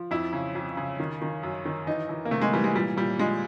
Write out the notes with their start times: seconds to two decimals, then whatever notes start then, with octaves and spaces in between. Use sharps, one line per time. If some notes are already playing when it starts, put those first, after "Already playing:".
Already playing: F3
0.11 F2 E4
0.33 C#3
0.55 F2
0.77 C#3
1.00 D#3
1.22 D#3
1.43 F#2
1.65 D#3
1.87 E3 D#4
2.09 E3
2.25 A#3
2.31 C3 A3
2.42 G#3
2.53 E3 G3
2.64 G#3
2.75 A#2 G3
2.97 A#2 G3
3.19 F3 G#3